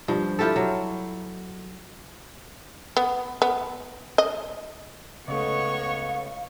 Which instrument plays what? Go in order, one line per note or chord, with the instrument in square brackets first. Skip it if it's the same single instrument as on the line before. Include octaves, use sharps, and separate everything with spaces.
[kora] G2 F3
E4 F4 G4 A4
F#3
[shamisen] B3
B3
D#5
[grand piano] C#2 A3 [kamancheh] B3 C#6 [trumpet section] C#5 D#5 [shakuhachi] F5